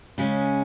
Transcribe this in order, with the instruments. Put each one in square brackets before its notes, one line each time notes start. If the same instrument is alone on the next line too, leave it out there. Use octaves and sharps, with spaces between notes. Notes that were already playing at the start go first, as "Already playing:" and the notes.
[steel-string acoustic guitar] C#3 G#3 C#4